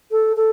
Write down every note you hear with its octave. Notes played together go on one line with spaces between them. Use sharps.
A4
A4